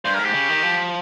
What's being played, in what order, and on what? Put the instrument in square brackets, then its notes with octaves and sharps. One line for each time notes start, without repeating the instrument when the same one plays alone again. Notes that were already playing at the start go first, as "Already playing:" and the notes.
[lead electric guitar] G2 [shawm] C5
[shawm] A#4
[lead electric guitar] G#2
[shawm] G4
[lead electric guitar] C#3
D#3
F3